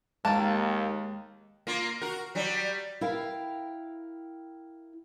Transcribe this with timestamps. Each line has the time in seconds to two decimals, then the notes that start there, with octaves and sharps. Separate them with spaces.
0.25 D#2 D#3 G#3 A#3 A5
1.67 A#3 F4
2.01 F#4 A#4
2.35 F#3 G3
3.01 E4 A#4 F5 G5